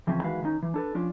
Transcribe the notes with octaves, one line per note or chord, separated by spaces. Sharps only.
C#2 E3 F3 C4 C#4
D#3 E3 G#3 F#4 B4 F5
D#3 C#4 D#4
E3
D4 A4 B4
F3 C#4 D4 F4